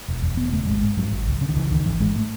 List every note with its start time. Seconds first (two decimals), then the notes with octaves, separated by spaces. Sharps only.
0.08 E1
0.23 E2
0.37 E1 B3
0.52 C#3 A3
0.67 G#1 G#3
0.83 G#2
0.97 G#2 F#3
1.11 G#1
1.27 C#2
1.41 C#3
1.48 D#3
1.56 C#3 E3
1.71 C#2 D#3
1.86 G#1 E3
2.00 G#2 G#3
2.16 A3